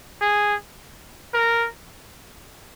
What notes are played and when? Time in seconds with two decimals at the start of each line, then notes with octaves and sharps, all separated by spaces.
0.21 G#4
1.34 A#4